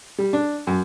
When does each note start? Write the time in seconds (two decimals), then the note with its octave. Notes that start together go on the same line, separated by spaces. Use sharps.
0.18 G3
0.33 D4
0.67 F#2